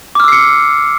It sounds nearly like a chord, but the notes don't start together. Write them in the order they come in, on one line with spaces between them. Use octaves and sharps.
D6 F6 E6 C7 C#7